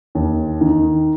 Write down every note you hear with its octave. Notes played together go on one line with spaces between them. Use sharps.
D#2
D#3